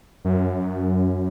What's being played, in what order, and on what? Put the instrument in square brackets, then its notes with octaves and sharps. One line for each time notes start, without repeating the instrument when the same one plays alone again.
[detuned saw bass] F#2